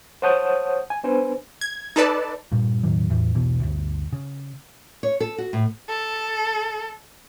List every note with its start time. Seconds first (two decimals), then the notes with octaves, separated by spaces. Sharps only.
0.22 C5 C#5 F#5 A5 D#6 G6
0.90 G#5
1.04 B3 D4 B4 C5 G#5
1.61 G#6
1.96 D#4 A4 B4 D5 A5
2.52 G2 A#2
2.83 E1 A2 D#3 F#3
3.10 E2 A2 E3
3.35 E1 B1 B2 E3
3.60 G1 D2
4.13 C#3
5.03 C#5
5.20 A4
5.38 F#4
5.53 A2
5.89 A4